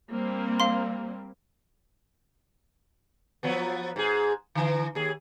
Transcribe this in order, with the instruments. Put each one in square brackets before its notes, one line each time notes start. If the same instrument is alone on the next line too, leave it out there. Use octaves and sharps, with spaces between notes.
[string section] G3 A#3 C4
[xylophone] F5 C6
[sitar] F3 F#3 B3
G#2 G#4
D3 E3
D#2 G#4